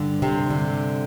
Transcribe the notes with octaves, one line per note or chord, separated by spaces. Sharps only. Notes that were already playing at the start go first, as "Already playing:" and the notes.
Already playing: G2 D3
C3 C4
G2 D3